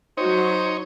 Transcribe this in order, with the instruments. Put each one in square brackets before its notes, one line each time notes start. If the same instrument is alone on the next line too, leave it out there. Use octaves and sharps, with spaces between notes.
[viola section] F#3 F#4 [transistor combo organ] D#4 C#5 [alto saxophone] C5